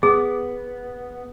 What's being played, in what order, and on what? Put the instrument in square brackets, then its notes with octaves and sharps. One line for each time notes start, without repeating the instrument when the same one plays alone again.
[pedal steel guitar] B3 [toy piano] G#4